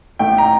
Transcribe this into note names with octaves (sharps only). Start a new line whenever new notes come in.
A1 A2 A3 G5
A#5